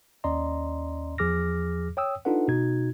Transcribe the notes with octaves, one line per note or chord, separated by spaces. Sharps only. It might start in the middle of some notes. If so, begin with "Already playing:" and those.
D#2 C#4 D5 D#5 A#5 C6
E2 F3 G#4 D6 F6 A#6
C#5 G5 D#6 E6
D4 D#4 F4 A4 B4 F#5
B2 D#4 F#4 G#6